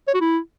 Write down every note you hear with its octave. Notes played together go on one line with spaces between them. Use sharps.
C#5
F#4
E4